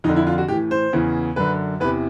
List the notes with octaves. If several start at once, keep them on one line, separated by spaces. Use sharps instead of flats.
F2 D3 D#4
E4
F4
F#4
A2 E3 G4
C5
E2 C#3 E3
F#2 D3 B4
E2 C3 E3 B4